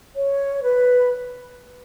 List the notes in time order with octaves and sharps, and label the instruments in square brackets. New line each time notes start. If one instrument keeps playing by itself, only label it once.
[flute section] C#5
B4